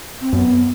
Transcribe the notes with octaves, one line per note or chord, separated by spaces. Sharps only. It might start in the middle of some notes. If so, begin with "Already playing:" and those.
C4
F#2 B3